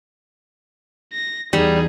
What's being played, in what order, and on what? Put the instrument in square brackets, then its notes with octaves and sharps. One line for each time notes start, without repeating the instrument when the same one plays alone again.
[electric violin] A#6
[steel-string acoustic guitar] E2 [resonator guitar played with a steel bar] G3 [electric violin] D#4 G#4